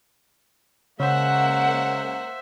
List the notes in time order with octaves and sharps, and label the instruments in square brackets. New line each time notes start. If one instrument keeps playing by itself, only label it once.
[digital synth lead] C#3 [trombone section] G#3 C#4 [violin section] A#3 F#5 [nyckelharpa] C5 E5